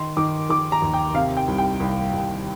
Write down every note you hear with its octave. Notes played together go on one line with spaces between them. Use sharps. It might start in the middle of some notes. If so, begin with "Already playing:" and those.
Already playing: D#3 C6
D#3 D6
D#3 D6
A#5
D#2
G5
C3 F5
G5
C2
G5
C2
C2